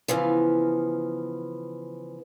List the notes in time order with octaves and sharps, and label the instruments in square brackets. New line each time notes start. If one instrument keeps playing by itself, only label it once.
[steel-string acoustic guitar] C#3 E3 F3 B3